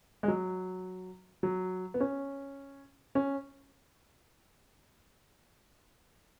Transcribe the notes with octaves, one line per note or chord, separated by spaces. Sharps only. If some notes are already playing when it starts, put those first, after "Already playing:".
G#3
F#3
F#3
B3
C#4
C#4